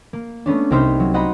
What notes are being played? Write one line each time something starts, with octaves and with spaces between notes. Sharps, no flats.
A#3
A3 B3 C#4 D4
C2 C4 D#4 C5 F6 B6
F#3
C5 D#5 F#5 A#5 B5